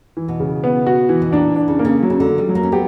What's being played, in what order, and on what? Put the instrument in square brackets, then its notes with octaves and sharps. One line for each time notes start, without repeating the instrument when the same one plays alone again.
[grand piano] E3
[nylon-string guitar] B2
[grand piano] C#3
B3
F#4
E3
[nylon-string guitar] B2
[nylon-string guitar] A#2 [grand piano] D4
[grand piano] D4
[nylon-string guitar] C#3
[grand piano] A#3
[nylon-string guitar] C#3
[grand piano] F#3
[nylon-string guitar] C#3
D3
[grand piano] F#3
[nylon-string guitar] G3
[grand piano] F#3
[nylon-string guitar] A#3
C#4
[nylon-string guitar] B3 [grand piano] G4